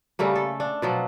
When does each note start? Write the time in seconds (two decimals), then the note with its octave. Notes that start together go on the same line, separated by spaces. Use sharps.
0.19 C#3 G3 A3 A#3
0.36 A4
0.60 D4
0.82 B2 F3 F#3